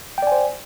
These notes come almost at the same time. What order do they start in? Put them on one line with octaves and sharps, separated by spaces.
G5 D5 G#5 C5